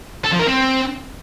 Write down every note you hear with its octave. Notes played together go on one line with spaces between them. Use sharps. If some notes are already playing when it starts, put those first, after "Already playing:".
A4
F3
A#4
C4